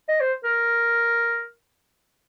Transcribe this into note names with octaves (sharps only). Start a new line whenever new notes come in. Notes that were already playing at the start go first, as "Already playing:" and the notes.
D#5
C5
A#4